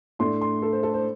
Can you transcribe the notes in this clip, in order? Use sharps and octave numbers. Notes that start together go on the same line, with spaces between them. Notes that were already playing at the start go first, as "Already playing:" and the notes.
A2 A3 D4 C6
C6
A4
C5
A4
C5